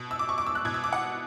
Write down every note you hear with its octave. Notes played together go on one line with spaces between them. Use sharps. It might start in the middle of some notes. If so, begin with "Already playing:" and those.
Already playing: B2
E6
D6
C#6
D6
E6
F#6
B2 G#6
E6
D6
F#5